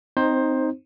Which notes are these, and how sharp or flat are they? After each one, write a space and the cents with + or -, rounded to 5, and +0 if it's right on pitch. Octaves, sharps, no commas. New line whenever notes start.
C4 -10 D#4 +0 C5 +15